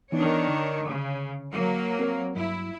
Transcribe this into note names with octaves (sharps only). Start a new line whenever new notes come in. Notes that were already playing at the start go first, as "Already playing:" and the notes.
D#3 E3 B3 D4 D#4 C#5
D3
C#3
F#3 A#3
C4 A#4 C#5
G2 F#3 E4